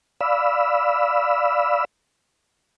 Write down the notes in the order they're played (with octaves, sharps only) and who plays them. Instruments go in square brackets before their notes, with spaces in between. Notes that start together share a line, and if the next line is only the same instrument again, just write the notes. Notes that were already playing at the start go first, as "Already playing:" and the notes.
[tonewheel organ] D5 F5 B5 E6